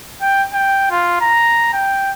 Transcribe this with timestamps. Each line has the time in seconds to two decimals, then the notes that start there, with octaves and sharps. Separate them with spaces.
0.22 G5
0.53 G5
0.90 F4
1.21 A#5
1.73 G5